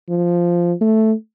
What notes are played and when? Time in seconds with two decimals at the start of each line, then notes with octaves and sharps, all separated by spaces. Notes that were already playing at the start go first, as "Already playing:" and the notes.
0.09 F3
0.81 A3